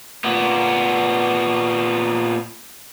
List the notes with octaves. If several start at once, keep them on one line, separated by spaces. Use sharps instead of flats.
A#2 B3